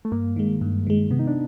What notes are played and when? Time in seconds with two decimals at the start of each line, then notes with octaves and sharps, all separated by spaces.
0.05 A3
0.12 G2 A#3
0.36 D#3 G#3
0.61 G2
0.87 D#3 G#3
1.11 C3 B3
1.19 D#4
1.27 D4